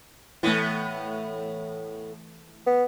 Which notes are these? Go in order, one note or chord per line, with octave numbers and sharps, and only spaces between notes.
A2 E3 A3 B3
B3